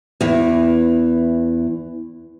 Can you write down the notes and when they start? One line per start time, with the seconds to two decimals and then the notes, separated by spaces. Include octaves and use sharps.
0.21 E2 E3